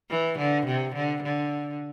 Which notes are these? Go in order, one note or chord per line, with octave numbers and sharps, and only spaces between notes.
E3
D3
C3
D3
D3